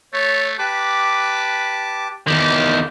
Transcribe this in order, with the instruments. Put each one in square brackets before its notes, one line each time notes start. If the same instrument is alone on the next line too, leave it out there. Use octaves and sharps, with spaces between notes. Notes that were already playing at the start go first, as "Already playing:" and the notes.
[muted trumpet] A3 [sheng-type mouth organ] C#5
[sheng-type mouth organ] G4 A5 D6 [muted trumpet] B4
[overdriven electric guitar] E2 D#3 [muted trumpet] G4